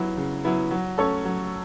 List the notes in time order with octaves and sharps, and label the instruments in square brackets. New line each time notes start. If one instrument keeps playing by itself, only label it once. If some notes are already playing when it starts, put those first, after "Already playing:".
Already playing: [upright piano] F#3 B3 E4
C#3
F#3 B3 E4
F#3
A3 C#4 A4 C#5
F#3